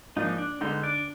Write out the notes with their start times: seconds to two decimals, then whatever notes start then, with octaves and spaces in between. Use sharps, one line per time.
0.16 G#2 F3 A#3 D4 D#4
0.38 D4
0.61 D3 G#3 B3 D#4
0.83 D4 D5